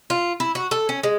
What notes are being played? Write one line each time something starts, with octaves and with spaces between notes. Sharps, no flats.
F4
E4
F#4
A4
C#4
G#3